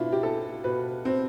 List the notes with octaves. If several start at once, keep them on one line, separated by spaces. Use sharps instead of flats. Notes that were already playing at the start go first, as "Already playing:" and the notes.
Already playing: B2 D4 E4 F4
G4
A4
B2 B4
C4